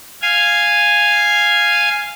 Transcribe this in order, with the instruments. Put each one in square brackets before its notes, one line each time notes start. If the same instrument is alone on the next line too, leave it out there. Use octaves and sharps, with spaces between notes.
[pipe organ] F5 G#5